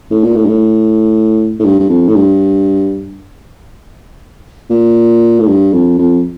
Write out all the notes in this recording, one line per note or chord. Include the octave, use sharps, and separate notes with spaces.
A2
A#2
A2
G2
A2
A2
G2
G2
F2
A2
G2
A#2
A2
G2
F2
F2